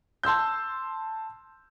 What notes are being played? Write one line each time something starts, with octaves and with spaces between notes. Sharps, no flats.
A5 C6 E6 G6